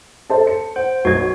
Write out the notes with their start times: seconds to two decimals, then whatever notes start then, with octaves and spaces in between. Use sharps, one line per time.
0.30 A4 C5 A5
0.47 C#7
0.76 C5 F#5
1.05 B1 F#4 G#6